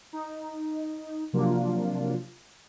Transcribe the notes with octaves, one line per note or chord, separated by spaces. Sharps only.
D#4
C3 F3 F#3 A#3 D4 F4